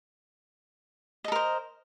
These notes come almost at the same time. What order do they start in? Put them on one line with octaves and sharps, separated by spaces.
D#5 A4 A#4 C5